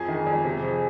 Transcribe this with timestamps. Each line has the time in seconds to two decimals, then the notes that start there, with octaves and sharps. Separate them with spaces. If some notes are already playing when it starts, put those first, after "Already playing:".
Already playing: F2 G#4
0.08 D#3
0.27 F2
0.45 C3
0.63 F3